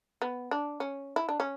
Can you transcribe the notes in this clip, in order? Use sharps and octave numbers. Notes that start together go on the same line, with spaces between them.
B3
D4
C#4
E4
D4
C#4